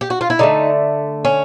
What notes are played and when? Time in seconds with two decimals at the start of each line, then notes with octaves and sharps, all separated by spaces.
0.01 G4
0.10 F#4
0.21 F4
0.30 E4
0.39 D3 F#3 A3 D#4
1.25 C#4